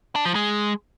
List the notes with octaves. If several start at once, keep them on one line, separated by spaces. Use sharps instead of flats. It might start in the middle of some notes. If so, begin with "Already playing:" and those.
D4
F3
G#3